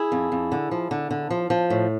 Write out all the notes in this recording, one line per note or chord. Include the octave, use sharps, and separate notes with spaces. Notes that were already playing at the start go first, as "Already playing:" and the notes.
Already playing: E4 G#4
F2
F2
D3
F3
D3
D3
F3
F3
A2